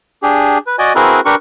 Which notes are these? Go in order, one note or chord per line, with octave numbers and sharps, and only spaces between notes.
D4 G4 G#4
B4
F#4 D5 D#5 G#5
C4 E4 F#4 G#4 A#4 B4
D4 G4 A#4 B4 C#6